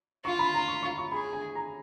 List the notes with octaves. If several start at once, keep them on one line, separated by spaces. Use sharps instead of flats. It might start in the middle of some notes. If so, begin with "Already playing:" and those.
F4 C#6
B5
A#5
C#6
C#6
C#6
G#4 B5
G#5
A#5